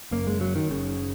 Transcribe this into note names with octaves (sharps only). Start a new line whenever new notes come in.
F#1 F#2 C#3 A#3
G#3
F#3
D#3
F#1 F#2 C#3